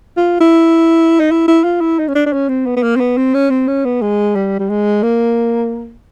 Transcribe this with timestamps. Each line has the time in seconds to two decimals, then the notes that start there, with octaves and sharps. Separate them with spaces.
0.17 F4
0.40 E4
1.20 D#4
1.31 E4
1.48 E4
1.64 F4
1.81 E4
1.99 D#4
2.08 C#4
2.15 D4
2.26 D4
2.33 C#4
2.49 C4
2.66 B3
2.76 B3
2.82 A#3
2.96 C4
3.00 B3
3.17 C4
3.34 C#4
3.50 C4
3.67 C#4
3.85 B3
4.02 G#3
4.35 G3
4.59 G3
4.69 G#3
5.03 A#3